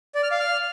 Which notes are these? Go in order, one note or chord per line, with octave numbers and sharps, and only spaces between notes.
D5
F6
F5
F6